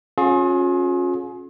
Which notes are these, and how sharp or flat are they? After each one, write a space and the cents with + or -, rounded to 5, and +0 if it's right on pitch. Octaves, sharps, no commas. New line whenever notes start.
C#4 -20 F4 +40 G#4 +25